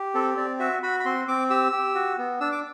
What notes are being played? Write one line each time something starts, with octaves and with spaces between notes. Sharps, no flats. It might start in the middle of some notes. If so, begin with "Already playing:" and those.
Already playing: G4
C4 A4
C4 D5
F#4 E5
F#4 B5
B5
C4 C6
C4 D6
G4 E6
G4
F#4
B3
D4 E6
D6